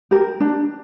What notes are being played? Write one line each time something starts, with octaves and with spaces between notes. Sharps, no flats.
G4 A#4
D4